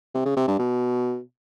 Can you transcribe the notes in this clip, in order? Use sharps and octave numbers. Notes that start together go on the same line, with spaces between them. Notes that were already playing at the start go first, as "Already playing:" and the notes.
C3
C#3
C3
G2
B2